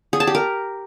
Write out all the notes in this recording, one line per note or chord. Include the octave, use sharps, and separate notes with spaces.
G#4
A5
G4
A#4